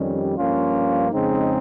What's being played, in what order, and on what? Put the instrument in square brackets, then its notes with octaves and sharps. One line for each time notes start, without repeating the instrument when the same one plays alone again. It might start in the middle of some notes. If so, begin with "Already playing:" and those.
Already playing: [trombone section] F2 D#3 G3 C#4
G2 F3 A#3 C#4 F4
F2 C#3 G#3 C4 D#4